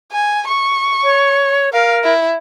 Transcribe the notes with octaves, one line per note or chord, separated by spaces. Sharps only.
G#5
C#6
C#5
A#4 F5
E4